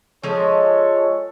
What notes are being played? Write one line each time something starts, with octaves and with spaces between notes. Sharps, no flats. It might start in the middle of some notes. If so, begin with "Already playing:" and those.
F3 G#3 A4 C#5